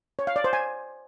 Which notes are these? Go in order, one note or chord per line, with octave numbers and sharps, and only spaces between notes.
C#5
F5
D5
C5
G#5